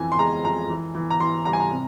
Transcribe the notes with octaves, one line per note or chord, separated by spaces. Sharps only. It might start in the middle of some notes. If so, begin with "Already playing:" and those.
Already playing: F2 E3 G#5
C6
G#3 A#5
F2 A#5
E3
E3
A#5
E3 C6
G3 A#5
G#5
A#5
C3